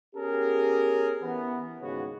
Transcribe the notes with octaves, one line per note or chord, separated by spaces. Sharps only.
B3 C#4 G4 G#4 A#4
E3 B3
D#2 G#2 C#3 B3 F#4 C#5